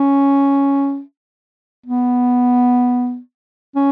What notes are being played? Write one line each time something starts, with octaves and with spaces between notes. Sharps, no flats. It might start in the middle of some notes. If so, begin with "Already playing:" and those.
Already playing: C#4
B3
C#4